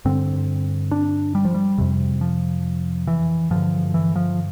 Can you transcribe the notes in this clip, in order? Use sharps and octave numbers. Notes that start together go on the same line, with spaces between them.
G2 D3 C4
D4
G3
F3
G3
F2 C3
F3
E3
G2 D3 F3
E3
F3